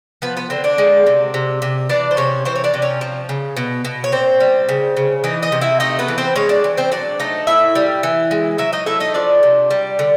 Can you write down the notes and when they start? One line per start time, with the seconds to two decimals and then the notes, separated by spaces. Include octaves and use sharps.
0.22 F3 B3 B4
0.37 B3 B4
0.50 D3 C4 C5
0.64 D4 D5
0.78 G#3
1.06 C3
1.34 C3
1.62 C3
1.89 E3 D4 D5
2.11 C5
2.17 C3 C#4 C#5
2.45 E3 C4 C5
2.56 C#5
2.64 D4 D5
2.74 C3
2.82 C#4 C#5
3.01 F3
3.29 C#3
3.57 B2
3.85 B2
4.04 C#5
4.12 A#2 C4 C5
4.40 G3
4.69 C#3
4.97 C#3
5.24 E3 D#4 D#5
5.42 D#4 D#5
5.52 C3
5.61 E4 E5
5.80 A3 D#4 D#5
5.99 B3 B4
6.08 E3
6.18 C4 C5
6.36 G#3 C#4 C#5
6.49 D4 D5
6.64 E3
6.77 C4 C5
6.92 F#3 D4 D5
7.20 A3 D#4 D#5
7.47 A2 E4 E5
7.75 G3
8.03 E3
8.31 G#3
8.58 F#3 E4 E5
8.73 D#4 D#5
8.86 A3 E4 E5
9.00 D#4 D#5
9.14 F3 D4 D5
9.43 C3
9.71 G3
9.99 D3